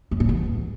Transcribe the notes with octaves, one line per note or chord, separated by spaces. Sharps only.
F#2
A2
E2